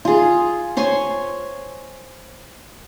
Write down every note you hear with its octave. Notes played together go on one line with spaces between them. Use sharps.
F4 G#4
C5 C#5 G#5 C6